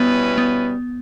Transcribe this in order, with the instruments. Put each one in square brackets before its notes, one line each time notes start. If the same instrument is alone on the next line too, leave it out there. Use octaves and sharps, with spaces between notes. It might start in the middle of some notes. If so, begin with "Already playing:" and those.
Already playing: [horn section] B2 G3 C#4 E4 B4 [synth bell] B3
[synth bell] B3